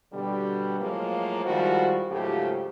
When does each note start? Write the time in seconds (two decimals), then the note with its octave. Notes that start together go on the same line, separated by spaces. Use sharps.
0.13 B2 D3 G3
0.80 A2 F3 F#3 G#3 A#3
1.45 D#3 F3 G3 G#3 E4 F#4
2.10 G#2 C#3 F3 F#3 A3 G4